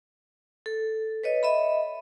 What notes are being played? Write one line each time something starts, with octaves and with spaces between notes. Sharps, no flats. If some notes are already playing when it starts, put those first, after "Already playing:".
A4
B4 C#5 D#5
D#5 E5 B5